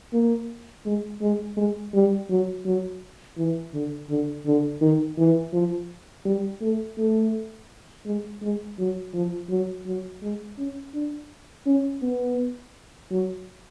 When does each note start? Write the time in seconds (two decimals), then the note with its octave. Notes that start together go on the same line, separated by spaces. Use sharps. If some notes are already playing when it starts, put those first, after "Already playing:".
0.13 A#3
0.86 G#3
1.21 G#3
1.57 G#3
1.94 G3
2.30 F#3
2.65 F#3
3.38 E3
3.74 D3
4.10 D3
4.46 D3
4.81 D#3
5.18 E3
5.53 F3
6.25 G3
6.61 A3
6.98 A3
8.06 G#3
8.42 G#3
8.78 F#3
9.14 F3
9.50 F#3
9.86 F#3
10.22 G#3
10.58 C#4
10.94 D4
11.66 C#4
12.02 B3
13.11 F#3